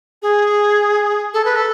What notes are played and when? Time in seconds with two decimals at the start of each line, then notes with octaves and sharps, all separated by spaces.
0.22 G#4
1.34 A4
1.45 B4
1.56 A4